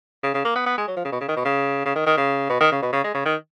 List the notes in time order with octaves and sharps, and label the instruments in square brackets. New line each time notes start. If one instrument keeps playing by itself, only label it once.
[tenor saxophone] C#3
C#3
A#3
B3
B3
G#3
F#3
F3
C#3
B2
C#3
D#3
B2
C#3
C#3
D#3
D#3
C#3
B2
D#3
C#3
B2
C#3
G#3
C#3
D#3